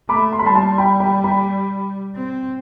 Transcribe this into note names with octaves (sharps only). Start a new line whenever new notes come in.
A3 B5 D6
C6
B5
G3 A5 C6
A5 C6
G5 B5
G5 B5
G5 B5
C4